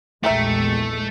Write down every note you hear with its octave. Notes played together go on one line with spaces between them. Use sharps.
A#1 E2 G#3 A3 G4 A#4 E5